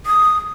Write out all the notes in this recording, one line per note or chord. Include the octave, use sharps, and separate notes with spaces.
D#6